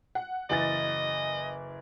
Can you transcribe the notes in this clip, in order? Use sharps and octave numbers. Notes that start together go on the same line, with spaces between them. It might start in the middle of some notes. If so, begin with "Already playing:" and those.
F#5
F#1 E3 D#5 A6